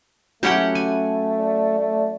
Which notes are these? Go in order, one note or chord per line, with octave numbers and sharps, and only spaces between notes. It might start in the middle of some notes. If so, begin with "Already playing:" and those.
F#3 A3 C#4 E4 G4 F#5 G5
G#5
D5
A3